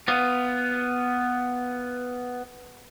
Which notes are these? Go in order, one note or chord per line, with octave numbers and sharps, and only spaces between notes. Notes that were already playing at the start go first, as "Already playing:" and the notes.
B3 F4